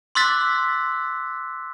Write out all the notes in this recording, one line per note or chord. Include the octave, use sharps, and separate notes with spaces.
C6 D6 E6 F#6 A6 B6